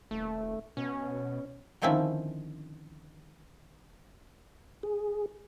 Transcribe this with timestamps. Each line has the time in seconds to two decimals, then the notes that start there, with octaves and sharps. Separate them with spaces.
0.11 D#1 A3
0.77 B2 C#4
1.82 D3 D#3 F3 C4 C#4 E4
4.83 G#4